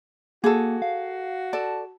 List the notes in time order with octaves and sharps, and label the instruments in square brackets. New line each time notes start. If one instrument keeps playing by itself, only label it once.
[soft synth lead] A#3 [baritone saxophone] F#4 [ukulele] G#4 A4
[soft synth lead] F5
[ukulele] A4 D5 [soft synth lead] A5